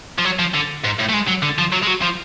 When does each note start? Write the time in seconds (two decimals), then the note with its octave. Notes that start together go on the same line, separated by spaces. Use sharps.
0.19 F3
0.25 F#3
0.39 F3
0.54 D3
0.84 G#2
0.99 A2
1.09 A3
1.13 G#3
1.28 F#3
1.42 D3
1.58 F3
1.73 F#3
1.83 G#3
1.87 F#3
2.02 F3